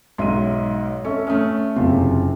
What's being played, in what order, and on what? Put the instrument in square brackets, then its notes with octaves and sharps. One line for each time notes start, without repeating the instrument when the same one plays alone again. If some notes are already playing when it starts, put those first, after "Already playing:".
[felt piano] B1 G#2 E5 [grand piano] C6 D#7
[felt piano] C#4 [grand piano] A4 E5 C#6
[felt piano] A3 C#4 [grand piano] D#6 F6
[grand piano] F#1 F#2 C3 [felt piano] F4